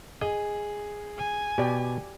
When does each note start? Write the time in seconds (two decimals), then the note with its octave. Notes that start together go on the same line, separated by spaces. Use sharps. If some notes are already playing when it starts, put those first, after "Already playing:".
0.21 G#4 D#5
1.17 G#5
1.58 B2 G4 D5